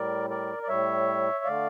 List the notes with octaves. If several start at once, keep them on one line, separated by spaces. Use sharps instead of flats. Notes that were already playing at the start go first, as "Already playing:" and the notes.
Already playing: A2 G3 A#4 D5
A#4 D5
D5
A2 G3 C#5 E5
D3 A3 D5 F5